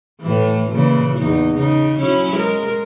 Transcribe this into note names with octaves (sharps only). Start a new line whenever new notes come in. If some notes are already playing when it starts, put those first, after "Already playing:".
A2 E3
A#2 C#3 E3
E2 D#4
C#3 D#4
F#3 C#4 E4
G#3 A#4